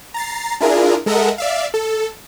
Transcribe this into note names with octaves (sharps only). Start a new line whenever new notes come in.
A#5 A6 C7
D4 E4 F4 G#4 A#4
G#3 A4 A#4 D#5 E5 F#5
D5 E5 F5
A4